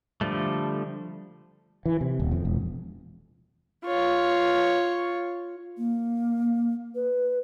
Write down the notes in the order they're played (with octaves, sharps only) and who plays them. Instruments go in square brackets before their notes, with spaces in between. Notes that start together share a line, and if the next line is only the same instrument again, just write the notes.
[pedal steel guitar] D3 F3 G3 A3
[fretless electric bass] E3
C3
D#1
F2
E1
[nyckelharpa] F4 C#5
[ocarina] A#3
B4